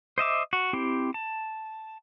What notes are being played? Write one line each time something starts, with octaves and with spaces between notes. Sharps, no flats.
C5 D#5 E5 D6
F#4
C4 E4 G4
A5